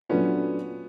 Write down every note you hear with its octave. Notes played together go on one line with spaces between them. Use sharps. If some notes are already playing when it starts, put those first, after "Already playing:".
A#2 F#3 A3 B3 C#4 D4 F4